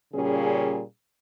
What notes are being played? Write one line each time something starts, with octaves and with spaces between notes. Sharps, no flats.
A#2 C#3 G3 C#4 G#4